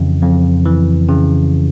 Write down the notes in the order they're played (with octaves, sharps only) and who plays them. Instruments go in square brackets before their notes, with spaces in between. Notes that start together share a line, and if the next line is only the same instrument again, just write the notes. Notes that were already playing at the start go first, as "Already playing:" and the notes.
Already playing: [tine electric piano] F2 C#3 E3
F2
E3
C#3